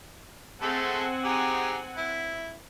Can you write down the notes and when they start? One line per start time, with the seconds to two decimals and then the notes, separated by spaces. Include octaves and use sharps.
0.62 G#3 A3 C4 A4 F#5 G#5
1.24 D#4 G4 G#4
1.97 E4